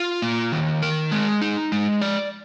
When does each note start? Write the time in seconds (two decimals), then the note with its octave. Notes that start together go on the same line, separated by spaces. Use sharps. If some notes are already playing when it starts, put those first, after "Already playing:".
Already playing: F4
0.22 A#3
0.52 D#3
0.82 A#4
1.11 G#3
1.42 D#4
1.72 G#3
2.01 D5